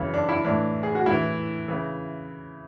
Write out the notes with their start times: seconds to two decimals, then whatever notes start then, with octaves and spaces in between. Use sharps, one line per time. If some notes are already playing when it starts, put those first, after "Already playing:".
Already playing: F#2 C#3 E3
0.14 D4
0.29 E4
0.45 A2 E3 D4
0.83 G#4
0.95 F#4
1.06 A2 E3 E4
1.68 C#3 E3